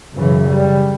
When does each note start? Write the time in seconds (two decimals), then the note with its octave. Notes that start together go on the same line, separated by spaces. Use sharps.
0.17 F#2 C#3 E3
0.49 G3